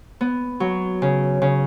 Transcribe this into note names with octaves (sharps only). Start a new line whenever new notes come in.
B3
F#3
C#3
C#3